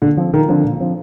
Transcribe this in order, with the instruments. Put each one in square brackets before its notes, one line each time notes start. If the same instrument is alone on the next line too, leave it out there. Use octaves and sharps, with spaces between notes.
[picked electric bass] A#2 [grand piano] D3
[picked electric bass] F3 C4
[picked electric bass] A#2 [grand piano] D#3
[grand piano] D3 [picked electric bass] F3 C4
[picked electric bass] A#2
F3 C4